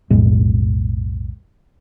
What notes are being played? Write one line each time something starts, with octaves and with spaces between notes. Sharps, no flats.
B1 F2 A2 G#3